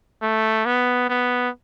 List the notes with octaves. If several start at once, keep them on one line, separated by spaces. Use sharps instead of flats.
A3
B3
B3